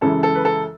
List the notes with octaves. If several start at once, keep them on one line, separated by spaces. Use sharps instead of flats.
F#2 C#3 E3 G#3 A4
A4
B4
A4